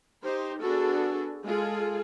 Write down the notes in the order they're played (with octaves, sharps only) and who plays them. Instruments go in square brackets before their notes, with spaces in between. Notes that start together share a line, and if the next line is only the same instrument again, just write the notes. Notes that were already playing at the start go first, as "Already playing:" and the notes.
[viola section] D#4 G4 C5
B3 D4 F#4 G#4 A4
G#3 F4 G#4 A4